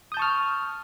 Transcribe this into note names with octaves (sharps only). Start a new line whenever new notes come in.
A5 C#6 D#6 F6 G6